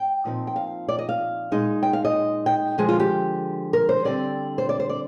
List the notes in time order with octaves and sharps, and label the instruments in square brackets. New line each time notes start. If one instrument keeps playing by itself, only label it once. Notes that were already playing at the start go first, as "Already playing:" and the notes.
Already playing: [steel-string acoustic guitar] G5
A#2 F3 C4 D#4
G5
F5
D5
D#5
F5
A#2 G#3 D#4
G5
F5
D#5
G5
D3 F3 G#3 G#4
F4
G4
A#4
C5
D3 G3 C4 D5
C5
D5
C5
D5